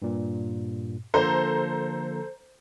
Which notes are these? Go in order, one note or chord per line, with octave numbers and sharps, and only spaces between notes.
G2 A#2
D3 F3 A#3 A4 C5 A#5